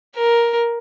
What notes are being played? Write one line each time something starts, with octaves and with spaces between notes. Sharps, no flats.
A#4